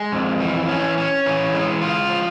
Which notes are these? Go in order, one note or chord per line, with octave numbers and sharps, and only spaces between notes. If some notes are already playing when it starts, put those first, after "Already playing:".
Already playing: G#3
F2
E3
C#4
C#4
E3
G#3
F4
F3